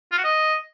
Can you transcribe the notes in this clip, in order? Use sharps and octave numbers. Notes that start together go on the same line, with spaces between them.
F4
F#4
D#5